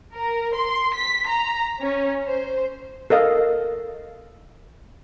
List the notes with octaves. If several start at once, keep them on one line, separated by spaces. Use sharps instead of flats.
A#4
C6
B6
A#5
C#4
C5
A4 A#4 D#5 F5